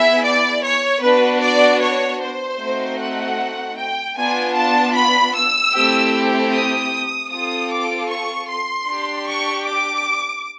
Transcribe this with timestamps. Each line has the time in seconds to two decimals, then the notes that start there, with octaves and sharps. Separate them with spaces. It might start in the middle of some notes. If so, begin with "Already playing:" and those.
Already playing: B3 E4 G#4 E5
0.24 D5
0.63 C#5
1.02 B3 D4 F#4 B4
1.42 D5
1.81 C#5
2.21 C5
2.60 A3 C4 D#4 F#4
2.99 F#5
3.77 G5
4.17 B3 D4 F4 G#5
4.55 A5
4.95 B5
5.35 E6
5.73 A3 C4 E4 G4
6.52 D#6
7.30 C4 F4 A4 D#6
7.70 D6
8.09 C#6
8.48 C6
8.87 D4 G4
9.27 C#6
9.65 D6